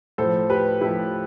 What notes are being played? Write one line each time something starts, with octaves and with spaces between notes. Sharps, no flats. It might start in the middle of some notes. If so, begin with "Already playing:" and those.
A2 F3 A4 C5
G4 B4
A2 F3 E4 G4